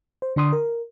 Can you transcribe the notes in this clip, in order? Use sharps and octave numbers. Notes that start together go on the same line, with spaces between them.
C5
D3 D4 C6 D#6
A#4